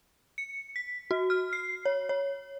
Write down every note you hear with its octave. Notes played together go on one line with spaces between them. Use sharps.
C#7
B6
F#4
F6
C7
C#5
C#5